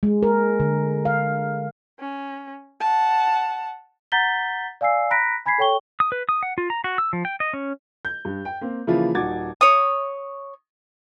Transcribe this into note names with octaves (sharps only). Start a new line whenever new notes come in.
G#3
A#4
D3
F5
C#4
F#5 A5
F#5 A#5 G6 A6 B6 G7
D5 F5 G#5 E6 C7
A#5 B5 F#6 A#6 B6 D7
G#5 B5 G#6 B6 C7
A4 C#5 G5 C#6 G7
D#6
B4
D#6
F#5
F4
A#5
F#4
E6
F3
G5
D#5
C#4
G6
G2
G5
A#3 C4
C#3 E3 F3 A#3 E4 F4
D#1 D#4 F#4 D6 G#6 A6
C#5 D#6